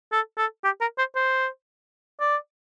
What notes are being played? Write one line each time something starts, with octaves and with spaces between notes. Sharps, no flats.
A4
A4
G4
A#4
C5
C5
D5